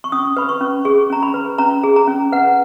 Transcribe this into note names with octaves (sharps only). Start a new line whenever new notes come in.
C#6
C#4 D#6
B4 B5
C#6
C#4
G#4 C#6
C#4 A#5
B5
B4
C#4 A#5
G#4
A#5
C#4
B4 F#5